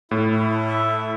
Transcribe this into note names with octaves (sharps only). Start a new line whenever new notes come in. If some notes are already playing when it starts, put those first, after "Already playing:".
A2 E4
E4
A4
E5
E4